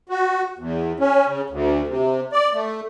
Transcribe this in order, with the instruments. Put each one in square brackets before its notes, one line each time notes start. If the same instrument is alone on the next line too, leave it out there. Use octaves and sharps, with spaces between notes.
[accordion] F#4
E2
C#4
C#3
D2
C3
D5
A3